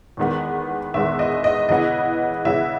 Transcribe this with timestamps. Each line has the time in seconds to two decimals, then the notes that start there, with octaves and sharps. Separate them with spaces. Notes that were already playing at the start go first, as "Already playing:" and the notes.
0.17 E2 D#3 G#3 B3
0.94 E2 D#3 G#3 B3 E5
1.19 D#5
1.44 D#5
1.69 C#3 E3 B3 D#5
2.45 C#3 E3 B3 E5